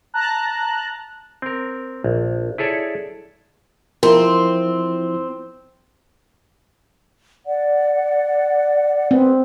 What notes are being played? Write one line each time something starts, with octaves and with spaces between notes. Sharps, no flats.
A5 A#5 F#6
C4 A#4
A#1
E4 G#4 A4 C#5 D5
F3 C4 E4 A#4
D5 F#5
C4 G#4 B4